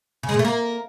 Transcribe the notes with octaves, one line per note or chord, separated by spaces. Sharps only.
C#3
G#3
A#2
A3
A#3